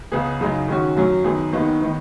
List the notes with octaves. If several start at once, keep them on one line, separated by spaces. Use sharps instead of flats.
C#2 C#3 B3 G#4
F#2 C#3 G#3 D#4
D#3 G#3 C#4 F#4
F#2 F#3 C#4
F#2 D#3 B3 G#4
D#2 D#3 B3 D#4
D#3 B3 D#4